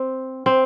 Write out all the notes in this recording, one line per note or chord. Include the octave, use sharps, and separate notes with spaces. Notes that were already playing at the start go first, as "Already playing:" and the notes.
Already playing: C4
C4